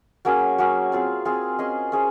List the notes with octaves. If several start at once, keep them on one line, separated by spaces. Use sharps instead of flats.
F#3 A#3 C#4 G#4
F#3 A#3 C#4 G#4
C4 F4 G#4
C4 F4 G#4
C#4 G#4 C5 D#5
C#4 G#4 C5